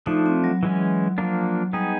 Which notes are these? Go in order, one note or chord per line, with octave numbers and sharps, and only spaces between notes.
F3 A3 D4 D#4
C4
F#3
E3 G#3 C#4
F3 A#3 D4
G3 B3 D#4 G#4